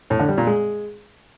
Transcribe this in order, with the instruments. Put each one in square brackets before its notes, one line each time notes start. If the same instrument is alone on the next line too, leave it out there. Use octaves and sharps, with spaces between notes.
[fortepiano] A2
D3
G3
A#2
G#3